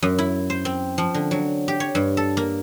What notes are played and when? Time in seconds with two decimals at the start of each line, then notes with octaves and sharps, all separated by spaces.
0.02 F#2
0.18 E4
0.50 C5
0.65 C4
0.98 F3
1.14 D3
1.31 F#3
1.68 G4
1.80 C#5
1.95 G2
2.17 A4
2.37 A#3